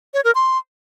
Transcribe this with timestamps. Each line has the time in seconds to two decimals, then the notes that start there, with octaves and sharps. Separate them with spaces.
0.14 C#5
0.24 A#4
0.35 C6